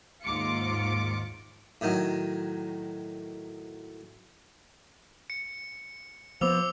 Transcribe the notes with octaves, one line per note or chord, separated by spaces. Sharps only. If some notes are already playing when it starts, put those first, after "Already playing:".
D#2 G#2 F4 D6 C#7
A2 D#3 F#3
C#7
F3 B3 C5 D6 E6 F7